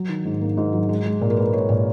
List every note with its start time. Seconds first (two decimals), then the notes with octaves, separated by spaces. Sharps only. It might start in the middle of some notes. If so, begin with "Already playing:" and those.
Already playing: F#3
0.09 D#3
0.25 G#2
0.41 A#3
0.57 G#2
0.73 F#3
0.89 G#3
1.06 G#3
1.21 A#2
1.30 A#4
1.37 G#3 B4
1.53 G#3 C#5
1.69 A#2 A#4